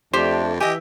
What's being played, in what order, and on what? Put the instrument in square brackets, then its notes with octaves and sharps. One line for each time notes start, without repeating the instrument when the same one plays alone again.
[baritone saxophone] F2 [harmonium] A3 D4 [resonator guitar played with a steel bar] G4 [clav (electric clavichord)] C5
[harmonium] E3 E5 [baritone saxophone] G4 [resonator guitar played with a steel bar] D#5 G#5